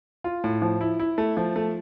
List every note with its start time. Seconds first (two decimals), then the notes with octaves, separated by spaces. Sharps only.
0.24 F4
0.44 A2
0.62 F3
0.81 E4
0.99 E4
1.18 A3
1.37 F3
1.56 A3